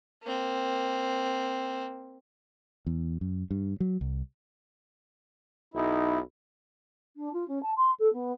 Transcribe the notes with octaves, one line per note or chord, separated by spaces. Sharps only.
A#3 C4
E2
F#2
G2
F#3
C2
B1 D#4 E4
D4
F4
C#4
A5
C6
A4
B3